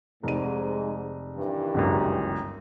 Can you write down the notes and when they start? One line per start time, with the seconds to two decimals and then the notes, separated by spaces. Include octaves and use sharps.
0.23 F1 G#2 D#7
1.37 G2 D#3 E3
1.74 G1 C#2 F#2